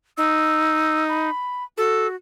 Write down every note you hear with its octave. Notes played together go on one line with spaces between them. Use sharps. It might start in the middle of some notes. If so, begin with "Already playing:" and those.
D#4 E6
B5
F#4 A4